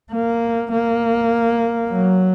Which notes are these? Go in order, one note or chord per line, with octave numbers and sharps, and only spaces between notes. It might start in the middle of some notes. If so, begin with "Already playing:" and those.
A#3
A#3
F#3